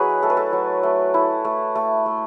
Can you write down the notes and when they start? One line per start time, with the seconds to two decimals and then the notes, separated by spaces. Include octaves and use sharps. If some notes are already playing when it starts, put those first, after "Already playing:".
Already playing: F#3 E4 G#4 B4 C#5 D#5
0.22 A3 A4
0.30 B4
0.37 A4
0.53 F#3
0.83 A3
1.14 E4
1.45 A3
1.75 A3
2.06 A3